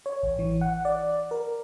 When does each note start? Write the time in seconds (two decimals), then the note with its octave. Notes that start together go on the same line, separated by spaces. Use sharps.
0.06 C#5
0.23 A1
0.39 E3
0.61 F#5
0.85 D5
1.31 A#4